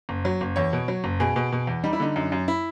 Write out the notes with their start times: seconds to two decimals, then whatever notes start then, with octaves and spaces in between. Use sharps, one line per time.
0.09 F#1
0.25 F#3
0.41 F#1
0.56 E2 C#5
0.73 B2
0.88 F#3
1.04 F#1
1.20 B2 G#4
1.36 B2
1.52 B2
1.67 E2
1.84 G3 D#4
1.93 E4
2.00 D3 D#4
2.16 F#2
2.32 F#2
2.48 E4